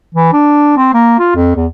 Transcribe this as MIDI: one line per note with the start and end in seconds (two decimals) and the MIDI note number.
0.15 0.30 52
0.33 0.74 62
0.77 0.94 60
0.94 1.16 58
1.19 1.31 65
1.35 1.55 41
1.56 1.67 40